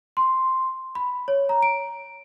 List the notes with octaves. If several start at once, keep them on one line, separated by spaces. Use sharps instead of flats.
C6
B5
C#5
A#5
D7